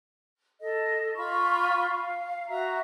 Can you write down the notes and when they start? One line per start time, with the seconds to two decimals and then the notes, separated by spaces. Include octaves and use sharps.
0.61 A4 D#5
1.16 F4 B5 C#6
1.87 F5
2.49 F#4 E5 A#5